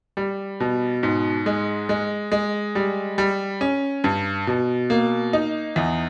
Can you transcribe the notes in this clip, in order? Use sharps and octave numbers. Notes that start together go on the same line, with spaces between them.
G3
B2
G#2
G#3
G#3
G#3
G3
G3
C#4
G2
B2
A#3
D#4
E2